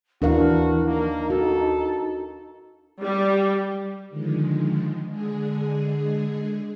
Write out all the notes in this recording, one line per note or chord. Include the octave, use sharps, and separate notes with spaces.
D#2 E3 D4 F#4 A#4 F5
A#3 D#4
F#4 A4
G3
D3 D#3 F3 G#3
D3 G#3 G#4